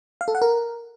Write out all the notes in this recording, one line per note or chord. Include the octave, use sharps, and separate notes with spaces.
F5
A4
F#5
A#4